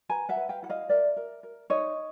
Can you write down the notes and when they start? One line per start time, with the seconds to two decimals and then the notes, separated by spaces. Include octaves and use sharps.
0.09 B4 G#5 A#5
0.29 E5 F#5
0.36 B4
0.49 F5 G5
0.63 E4 F#5
0.69 D#5 F5
0.89 A#4 D5 E5
1.17 A#4
1.43 A#4
1.70 D#4 C#5 D#5